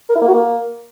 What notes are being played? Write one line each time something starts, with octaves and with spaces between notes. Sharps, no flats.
A#4
E4
A#3
F#4
A#3